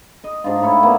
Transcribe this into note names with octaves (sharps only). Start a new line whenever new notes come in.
D#5
G#2 D4 D#4 F4
A2 E4 C#5
A#3 B3